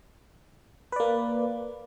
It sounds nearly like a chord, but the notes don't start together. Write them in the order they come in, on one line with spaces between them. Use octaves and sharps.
B4 D5 A#3